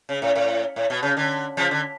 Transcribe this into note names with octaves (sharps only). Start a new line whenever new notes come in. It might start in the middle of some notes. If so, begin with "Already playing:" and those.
C#3
A2
A2
A2
B2
C#3
D3
C#3 F3
D3